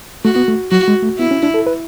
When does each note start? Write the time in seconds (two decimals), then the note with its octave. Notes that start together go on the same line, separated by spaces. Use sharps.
0.25 A3 F#4
0.36 B3
0.48 A3
0.71 F#3 F#4
0.88 G#3
1.02 A3
1.19 B3 E4
1.31 C#4
1.43 D4
1.54 A4
1.67 B4